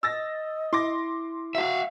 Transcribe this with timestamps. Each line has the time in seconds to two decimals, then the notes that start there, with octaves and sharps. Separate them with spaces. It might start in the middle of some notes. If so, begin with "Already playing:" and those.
0.03 D#5 E6 A6 A#6
0.73 E4 C6 D6 A#6
1.55 F#4 E5 F5